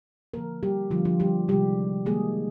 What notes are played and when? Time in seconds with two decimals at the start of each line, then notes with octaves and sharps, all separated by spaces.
0.34 D3 F3 A#3 A#4
0.63 G3 G4
0.91 D3 F3 G3 A#3 F4
1.05 F3 F4
1.20 G3 G4
1.48 C3 D#3 G3 G#3 G4
2.06 D#3 G3 G#3 A#3 G#4